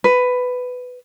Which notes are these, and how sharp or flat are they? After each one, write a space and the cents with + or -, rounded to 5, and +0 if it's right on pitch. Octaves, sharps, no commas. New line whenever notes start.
B4 +10